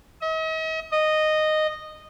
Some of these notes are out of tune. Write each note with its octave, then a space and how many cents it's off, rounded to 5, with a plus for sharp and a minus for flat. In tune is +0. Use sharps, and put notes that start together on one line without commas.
D#5 +45
D#5 -10